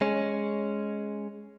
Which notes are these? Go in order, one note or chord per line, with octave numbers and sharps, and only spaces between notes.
G#3 C#4